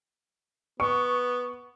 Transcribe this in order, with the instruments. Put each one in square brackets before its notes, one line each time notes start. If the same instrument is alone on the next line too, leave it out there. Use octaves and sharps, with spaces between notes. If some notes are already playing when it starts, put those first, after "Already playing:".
[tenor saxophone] B3 [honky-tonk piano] C#6